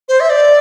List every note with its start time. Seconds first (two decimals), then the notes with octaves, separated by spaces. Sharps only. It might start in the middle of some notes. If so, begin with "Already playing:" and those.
0.09 C5
0.20 E5
0.30 D5